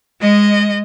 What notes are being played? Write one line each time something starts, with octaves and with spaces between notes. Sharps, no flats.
G#3 D#5